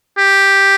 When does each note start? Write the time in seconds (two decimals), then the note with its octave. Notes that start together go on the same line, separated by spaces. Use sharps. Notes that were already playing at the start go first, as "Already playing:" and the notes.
0.18 G4